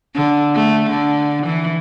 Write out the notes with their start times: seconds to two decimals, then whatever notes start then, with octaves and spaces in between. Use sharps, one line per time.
0.15 D3
0.55 A3
0.90 D3
1.46 E3